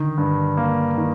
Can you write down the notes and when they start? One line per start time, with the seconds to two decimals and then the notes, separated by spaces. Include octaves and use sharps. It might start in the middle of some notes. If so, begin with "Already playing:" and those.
Already playing: D3 D#3
0.18 G2
0.57 A#3
0.98 D#3